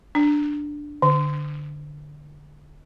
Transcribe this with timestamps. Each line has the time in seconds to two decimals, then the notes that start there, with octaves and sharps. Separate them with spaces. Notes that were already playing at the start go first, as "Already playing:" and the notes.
0.15 D4
1.02 D3